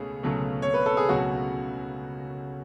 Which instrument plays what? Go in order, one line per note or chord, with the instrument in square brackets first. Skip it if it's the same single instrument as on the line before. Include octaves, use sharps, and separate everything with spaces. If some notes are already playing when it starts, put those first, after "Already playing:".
Already playing: [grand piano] C#2 B2 A3 C#4 [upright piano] G#4
[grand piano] C#2 B2 F#3 A3 C#4
[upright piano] C#5
B4
A4
G#4
[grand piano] C#2 B2 F#3 A3 C#4 [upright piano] F#4